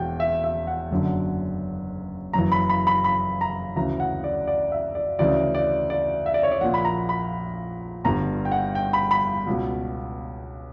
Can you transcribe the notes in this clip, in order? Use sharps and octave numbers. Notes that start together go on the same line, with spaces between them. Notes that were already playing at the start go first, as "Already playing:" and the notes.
Already playing: E1 E2 B2 G5
E5
E5
F#5
F#1 F#2 D3
F#1 F#2 E3 A#5
B5
B5
B5
B5
A#5
D2 C#3 E3 A#5
F#5
D5
D5
E5
D5
D2 C#3 E3 D5
D5
D5
E5
D5
C#5
D5
A#1 A#2 F#5
B5
A#5
B5
G1 G2 D3 A#5
G5
F#5
G5
B5
B5
C#2 B2